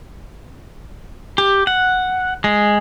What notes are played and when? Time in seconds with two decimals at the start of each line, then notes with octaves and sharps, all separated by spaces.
1.38 G4
1.67 F#5
2.44 G#3